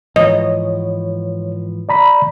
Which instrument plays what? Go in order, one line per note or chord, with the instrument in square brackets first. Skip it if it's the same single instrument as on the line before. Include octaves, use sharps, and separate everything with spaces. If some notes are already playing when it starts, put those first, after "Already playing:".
[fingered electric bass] G#2 E3 F3 [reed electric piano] C#5 [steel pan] D#5
[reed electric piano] D5 A#5 B5